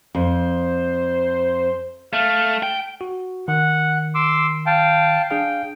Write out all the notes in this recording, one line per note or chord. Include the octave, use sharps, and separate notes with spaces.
F2 C5
A3 F5
G5
F#4
D#3 F#5
C6 D6 E6
F5 G5 A5
D4 G#4 F5 G5